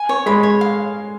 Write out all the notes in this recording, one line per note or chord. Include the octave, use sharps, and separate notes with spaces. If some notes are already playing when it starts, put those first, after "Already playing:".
Already playing: G#5
C#5
G#3 B5
C#5
F5